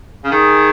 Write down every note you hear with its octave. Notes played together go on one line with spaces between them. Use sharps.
C#3
D#3 G#4